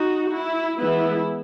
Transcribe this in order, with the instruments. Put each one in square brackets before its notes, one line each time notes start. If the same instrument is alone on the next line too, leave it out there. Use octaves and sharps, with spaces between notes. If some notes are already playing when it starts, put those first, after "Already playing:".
Already playing: [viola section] D#4 F#4
E4
E3 G#3 B3 E4